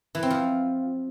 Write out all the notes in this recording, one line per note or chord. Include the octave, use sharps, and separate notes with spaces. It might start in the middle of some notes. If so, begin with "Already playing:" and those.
E3
C4
F3